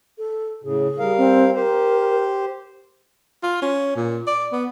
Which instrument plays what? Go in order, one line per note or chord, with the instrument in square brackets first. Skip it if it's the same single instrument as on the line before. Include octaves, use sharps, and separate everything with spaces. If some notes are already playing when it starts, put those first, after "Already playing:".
[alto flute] A4
[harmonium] A2 C#3 [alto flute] G#4
[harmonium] G3 A#4 F5
[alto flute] C4
[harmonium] G4 C5 [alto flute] A#4
[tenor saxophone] F4
C#4
A#2
D5
B3